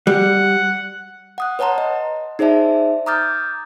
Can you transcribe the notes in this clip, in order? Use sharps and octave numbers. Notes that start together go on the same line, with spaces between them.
G3 F#5
F#5 D#6 F#6
B4 C#5 F#5 A5 A#5 C6
D#5
D#4 G#4 C5 D5 E5 A5
A#5 D6 D#6 F6 G6 A6